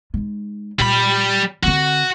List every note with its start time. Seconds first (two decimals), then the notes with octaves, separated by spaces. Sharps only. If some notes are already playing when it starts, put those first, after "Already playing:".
0.14 G#3 D#4
0.80 A#2 G3 B5
1.63 D3 C4 F#4